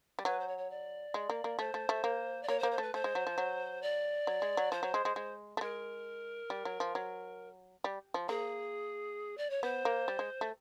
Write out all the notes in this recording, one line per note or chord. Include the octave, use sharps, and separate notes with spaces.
G3
F#3 B4
C5
C#5
C#5
D5
G#3
A#3
A#3
A3 C5
A3
A3
A#3
D5
A#3 C#5
C5
A#3
C5
A3 B4
A3 C5
G#3
F#3
F3
F#3
D5
F#3
G#3
F#3
F3 C5
F#3
G#3
G#3
G#3
A3
G#3 A#4
G3
F#3
F3
F#3
G3
F3
A#3 G#4
D5
C#5
B3 C5
A#3
G3
G#3
A3